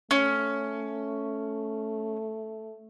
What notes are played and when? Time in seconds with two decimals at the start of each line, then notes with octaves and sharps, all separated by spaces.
0.11 A3 C#4